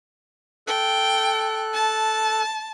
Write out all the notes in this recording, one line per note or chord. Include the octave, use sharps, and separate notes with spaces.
A4 G5 F#6
A5